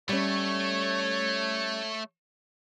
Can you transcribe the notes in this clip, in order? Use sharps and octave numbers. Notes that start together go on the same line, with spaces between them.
G3 A3 C#4 C#5